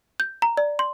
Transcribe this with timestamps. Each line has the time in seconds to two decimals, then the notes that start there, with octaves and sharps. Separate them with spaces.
0.20 G6
0.42 A#5
0.57 D5
0.79 C6